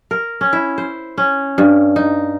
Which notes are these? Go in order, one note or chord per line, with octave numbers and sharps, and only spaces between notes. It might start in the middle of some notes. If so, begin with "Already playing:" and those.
A#4
C#4
E4
C5
C#4
G2
D#4